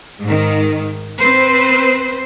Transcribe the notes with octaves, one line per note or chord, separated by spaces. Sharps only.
G#2 D#3
C4 B4 C5